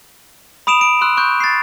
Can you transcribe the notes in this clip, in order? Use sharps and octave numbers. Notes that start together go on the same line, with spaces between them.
B5 D#6 D7 E7 F7
D7
C6 E6 F#6
C#6 F#6 G6
A6 C7